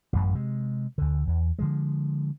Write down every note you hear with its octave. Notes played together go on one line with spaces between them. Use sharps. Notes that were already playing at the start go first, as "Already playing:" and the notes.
A1 F#2
C3 G#3
D2 D3
E2
D3 F3 G#3